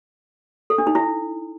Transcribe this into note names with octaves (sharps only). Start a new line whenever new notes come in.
A4
D4
D#4
E4